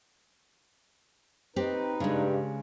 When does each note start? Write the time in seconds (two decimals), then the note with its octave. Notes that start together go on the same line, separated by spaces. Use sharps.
1.56 C4 D#4 G4 B4
2.00 G2 C#3 G#3